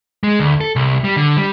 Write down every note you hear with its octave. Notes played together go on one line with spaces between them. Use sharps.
G#3
D2
A4
C2
G3
D3
G3